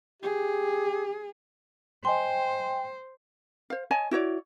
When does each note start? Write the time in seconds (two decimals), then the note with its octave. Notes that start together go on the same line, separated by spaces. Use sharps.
0.23 G4 G#4
2.05 C5 D#5 G5 G#5 C6
3.70 C5 F5
3.91 C#5 D#5 G#5 A5
4.11 E4 F#4 C#5 D5